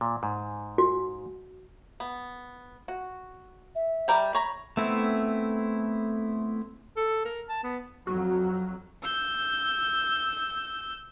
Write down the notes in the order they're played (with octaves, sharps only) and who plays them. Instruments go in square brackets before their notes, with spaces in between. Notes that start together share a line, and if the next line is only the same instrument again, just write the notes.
[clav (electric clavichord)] A#2
G#2
[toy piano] F#4
[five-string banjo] B3
F#4
[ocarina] E5
[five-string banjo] G3 A#4 G5
C#5 A#5 B5
[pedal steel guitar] A3 B3 C4 E4
[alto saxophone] A4
A#4
A5
B3
[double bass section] F2 F#3 [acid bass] F#4
[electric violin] E6 G6